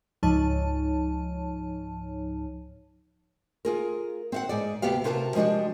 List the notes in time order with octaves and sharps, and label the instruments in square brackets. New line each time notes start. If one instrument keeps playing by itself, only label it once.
[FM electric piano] C#2 G#2 F3 D#4 C#5 A5
[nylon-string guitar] F4 G#4 A#4
C4 F5 F#5
G#2 G#4 D5
D2 C3 B3 G4 F5
C3 F4 F#4 A#4 F#5 A5
F3 G#3 D4 F#4 G4